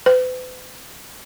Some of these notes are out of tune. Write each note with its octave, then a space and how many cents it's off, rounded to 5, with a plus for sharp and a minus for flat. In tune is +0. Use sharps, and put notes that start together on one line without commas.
B4 +45